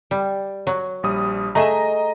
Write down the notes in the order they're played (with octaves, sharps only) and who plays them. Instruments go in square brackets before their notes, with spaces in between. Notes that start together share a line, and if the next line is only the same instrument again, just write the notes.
[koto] G3
F#3
[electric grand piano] A#1 G3 D#6
[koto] A3 G#4 E5 [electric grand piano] D#5 A#5